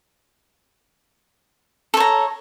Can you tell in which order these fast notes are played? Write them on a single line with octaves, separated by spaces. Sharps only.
A4 C#5 A#5